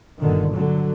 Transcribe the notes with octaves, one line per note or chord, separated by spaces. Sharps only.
G1 A#2 D3 D#3
D3 F#3